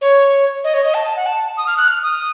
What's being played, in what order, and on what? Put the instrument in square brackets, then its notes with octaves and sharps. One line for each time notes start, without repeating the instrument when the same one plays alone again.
[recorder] C#5
D#5
C#5
D#5
A5
A5
F#5
A5
D#6
F6
F#6
F6
D#6